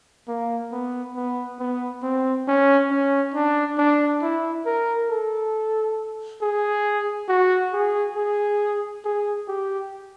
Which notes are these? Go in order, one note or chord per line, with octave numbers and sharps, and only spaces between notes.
A#3
B3
B3
B3
C4
C#4
C#4
D4
D4
E4
A#4
A4
G#4
F#4
G#4
G#4
G#4
G4